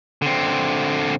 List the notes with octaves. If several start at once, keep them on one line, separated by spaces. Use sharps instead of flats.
D3 C4